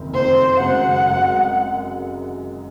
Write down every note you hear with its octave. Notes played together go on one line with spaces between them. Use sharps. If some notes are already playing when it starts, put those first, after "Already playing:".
Already playing: F#1 F2 D#3
F#1 F2 D#3 C5
F#1 F#2 C#3 G#3 F#5
F#1 F#2 C#3 G#3